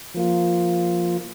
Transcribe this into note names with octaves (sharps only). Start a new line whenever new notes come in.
F3 A#3 F4